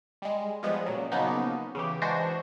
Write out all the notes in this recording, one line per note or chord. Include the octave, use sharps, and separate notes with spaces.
G3 G#3
F3 G3 G#3 B3
A#2 C#3 F#3
C#3 F3 F#3 A#3 B3 D#4
C#3 E3 G4
E3 G#3 D4 F#4 C5